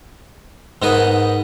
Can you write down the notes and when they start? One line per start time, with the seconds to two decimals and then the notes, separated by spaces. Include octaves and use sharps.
0.82 G#2 B3 D#4 A#4 B4 D#6